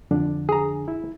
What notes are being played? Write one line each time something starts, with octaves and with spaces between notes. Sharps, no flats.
F2 D3 D4
G#4 A#5
E4